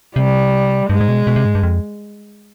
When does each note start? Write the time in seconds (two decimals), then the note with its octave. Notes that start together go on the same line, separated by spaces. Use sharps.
0.16 C3 G3
0.90 G2 G#3
1.01 G#2
1.08 B2
1.27 B2
1.36 C3
1.45 G#2
1.55 G2
1.63 F2